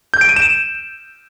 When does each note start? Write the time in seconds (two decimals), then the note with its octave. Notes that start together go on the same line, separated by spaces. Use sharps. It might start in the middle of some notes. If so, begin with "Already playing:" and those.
0.14 G6
0.21 D7
0.29 D#7
0.36 E7